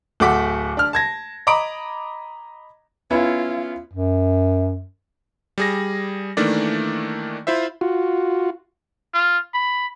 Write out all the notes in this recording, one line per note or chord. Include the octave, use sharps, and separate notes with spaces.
D1 A3 F#5 D6 B6
D4 F6
A5 G#6 A#6
D#5 A#5 B5 D6 D#6 D7
B3 C#4 E4 F4
F#2
G3 G#4 A#6
D#3 E3 A3 A#3 D4 D5
E4 F4 C5 E5
F4 F#4
F4
B5